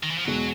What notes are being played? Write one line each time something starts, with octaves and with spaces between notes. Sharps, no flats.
D#3
E3
F3
E2 B2 F#3 G#3